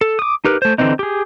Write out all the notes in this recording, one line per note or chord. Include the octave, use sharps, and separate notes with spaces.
A4
D6 D#6
D#4 G4 A#4 B4
A3 C5
D3 E3 C4 C#4 D#4
G4 G#4